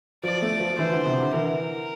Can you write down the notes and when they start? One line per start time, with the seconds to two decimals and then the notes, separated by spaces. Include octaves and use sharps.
0.23 F3 D5
0.42 A3
0.60 F3
0.78 E3 C5
0.92 D3
1.06 C3
1.20 D3
1.34 E3 A#4